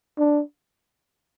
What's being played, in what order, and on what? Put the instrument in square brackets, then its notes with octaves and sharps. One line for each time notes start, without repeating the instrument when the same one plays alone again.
[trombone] D4